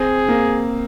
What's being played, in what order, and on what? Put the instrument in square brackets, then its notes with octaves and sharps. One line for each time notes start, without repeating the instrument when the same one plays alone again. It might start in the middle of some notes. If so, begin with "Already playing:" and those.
Already playing: [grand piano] C4 [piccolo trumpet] G#4
[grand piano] A#3